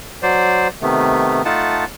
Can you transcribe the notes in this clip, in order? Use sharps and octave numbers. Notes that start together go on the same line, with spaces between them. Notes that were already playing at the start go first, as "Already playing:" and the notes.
F#3 C5 D5
C3 D#3 A3 B3
A3 D#4 F4 F#5 A5